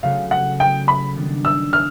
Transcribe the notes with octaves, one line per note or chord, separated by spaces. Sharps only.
C#3 F#3 A3 C#4 F#4 F5
F#5
G5
B5
D#3 G3 B3 D4
E6
F6